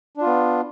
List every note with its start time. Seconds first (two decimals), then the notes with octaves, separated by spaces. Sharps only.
0.17 D4
0.22 F4
0.26 B3